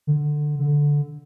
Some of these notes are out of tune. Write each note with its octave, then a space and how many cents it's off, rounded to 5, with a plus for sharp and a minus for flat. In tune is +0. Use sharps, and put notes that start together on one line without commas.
D3 +15
D3 -10